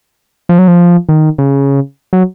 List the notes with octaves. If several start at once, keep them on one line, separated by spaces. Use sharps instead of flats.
F3
F#3
F3
D#3
C#3
F#3